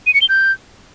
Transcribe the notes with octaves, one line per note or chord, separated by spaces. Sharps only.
D#7
C#7
G7
G6